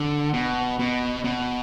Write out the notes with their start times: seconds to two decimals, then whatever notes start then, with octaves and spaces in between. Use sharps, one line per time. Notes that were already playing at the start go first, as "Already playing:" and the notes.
Already playing: D3
0.34 B2
0.79 B2
1.24 B2